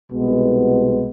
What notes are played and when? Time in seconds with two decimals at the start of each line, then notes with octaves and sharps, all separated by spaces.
0.11 C2 B2 G#3 B3